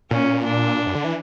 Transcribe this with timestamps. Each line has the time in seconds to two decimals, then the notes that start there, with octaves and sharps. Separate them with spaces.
0.11 A#2 C#4
0.44 D4
0.87 F#2
0.95 D3
1.04 E3